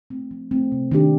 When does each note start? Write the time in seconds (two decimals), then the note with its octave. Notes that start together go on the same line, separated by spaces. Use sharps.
0.10 A3 C4
0.31 F3
0.51 A3 C4
0.72 C3
0.91 D#3 A#3 D4 G4